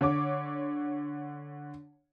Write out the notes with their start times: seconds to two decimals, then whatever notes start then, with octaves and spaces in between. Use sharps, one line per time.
0.01 D3 C#5 D6